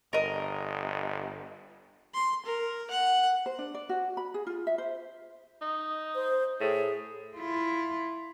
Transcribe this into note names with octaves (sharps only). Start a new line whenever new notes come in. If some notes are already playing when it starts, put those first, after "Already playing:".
G1 A#4 D#5
C6
A#4
F#5
C5
D4
D5
F#4
B5
G#4
F4
E5
C5
D#4
C5
A2 G#4
E4 F4